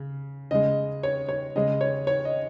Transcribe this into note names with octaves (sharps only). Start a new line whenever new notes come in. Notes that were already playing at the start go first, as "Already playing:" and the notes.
Already playing: C#3
C#3 G#3 D#5
C#5
C#5
C#3 G#3 D#5
C#5
C#5
D#5